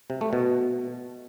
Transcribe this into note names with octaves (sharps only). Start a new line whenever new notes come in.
C3
A3
B2